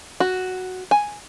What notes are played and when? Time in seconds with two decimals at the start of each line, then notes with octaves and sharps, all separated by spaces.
0.20 F#4
0.91 G#5